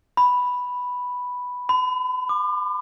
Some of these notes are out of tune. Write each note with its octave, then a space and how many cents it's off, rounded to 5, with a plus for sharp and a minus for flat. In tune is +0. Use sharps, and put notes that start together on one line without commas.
B5 +0
B5 +40
D6 +40